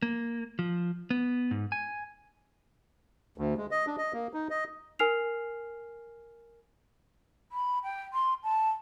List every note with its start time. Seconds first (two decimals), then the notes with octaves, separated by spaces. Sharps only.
0.02 A#3
0.59 F3
1.10 B3
1.51 G#2
1.72 G#5
3.38 D2
3.57 G#3
3.71 D#5
3.87 D4
3.98 D#5
4.13 A#3
4.34 D#4
4.50 D#5
4.99 A#4 G#5 F6 C7 F7
7.52 B5
7.83 G5
8.13 C6
8.43 A5